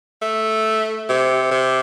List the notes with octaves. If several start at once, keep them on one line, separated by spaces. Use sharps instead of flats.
A3
C3
C3